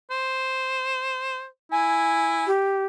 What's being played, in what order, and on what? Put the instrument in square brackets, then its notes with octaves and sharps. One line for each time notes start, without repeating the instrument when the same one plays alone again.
[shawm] C5
[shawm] E4 [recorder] G#5
[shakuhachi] G4